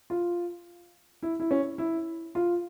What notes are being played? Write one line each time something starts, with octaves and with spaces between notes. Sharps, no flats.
F4
E4
E4
C#4
E4
F4